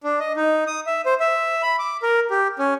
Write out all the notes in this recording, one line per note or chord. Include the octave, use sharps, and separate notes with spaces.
D4
D#5
D#4
D#6
E5
C5
E5
B5
D6
A#4
G4
C#4